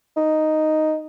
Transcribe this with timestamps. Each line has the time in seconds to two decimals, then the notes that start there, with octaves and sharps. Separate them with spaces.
0.17 D#4